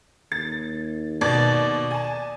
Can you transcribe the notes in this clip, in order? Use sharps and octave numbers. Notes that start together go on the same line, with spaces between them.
D#2 A6
B2 D5 A6
G#5 A5